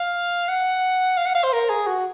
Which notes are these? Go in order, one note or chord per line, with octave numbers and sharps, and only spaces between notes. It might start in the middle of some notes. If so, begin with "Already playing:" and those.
Already playing: F5
F#5
F5
F#5
F5
C5
A#4
G#4
F#4